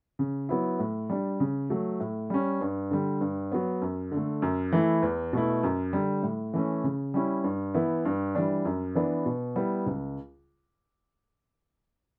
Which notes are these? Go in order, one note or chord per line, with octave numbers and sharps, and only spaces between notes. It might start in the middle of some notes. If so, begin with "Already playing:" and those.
C#3
F#3 B3 E4
A2
G3 D4
C#3
F#3 A3
A2
G3 C#4
G2
D3 G3
G2
F#3 B3
F#2
D3
A3
F#2
E3 A3 E4
E2
B2 A3 E4
F#2
D3 G3
A2
E3 A3 C#4
C#3
G3 C#4 E4
G2
E3 B3 E4
G2
E3 G3 D4
F#2
E3 B3 D4
B2
G3 B3 E4
C#2